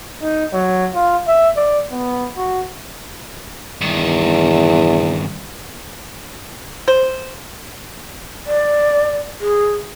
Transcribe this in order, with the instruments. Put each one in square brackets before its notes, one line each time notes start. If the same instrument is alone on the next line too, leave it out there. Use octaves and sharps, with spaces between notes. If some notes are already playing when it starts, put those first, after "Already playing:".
[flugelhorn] D#4
F#3
F4
E5
D5
B3
F#4
[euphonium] E2 [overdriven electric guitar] G2 D#3
[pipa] C5
[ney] D5
G#4